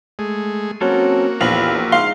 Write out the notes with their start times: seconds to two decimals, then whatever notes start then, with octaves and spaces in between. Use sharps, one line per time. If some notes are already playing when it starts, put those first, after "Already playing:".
0.19 G#3 A3 G#4
0.81 F#3 A#3 C4 C#4 F#4 A4
1.41 A#1 E2 F5 B5
1.92 G#2 F5 C6